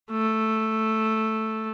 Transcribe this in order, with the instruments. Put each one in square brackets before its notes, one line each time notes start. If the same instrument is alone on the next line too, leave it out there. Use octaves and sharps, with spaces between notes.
[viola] A3